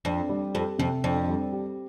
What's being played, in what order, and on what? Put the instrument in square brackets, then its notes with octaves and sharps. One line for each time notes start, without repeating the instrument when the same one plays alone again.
[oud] F2 [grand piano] D4
[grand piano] G3
[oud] F2 [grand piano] G4
[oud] F2 [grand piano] C3
[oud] F2 [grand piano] D4
[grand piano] G3
G4